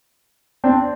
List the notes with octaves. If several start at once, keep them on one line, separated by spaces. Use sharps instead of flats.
C4 D4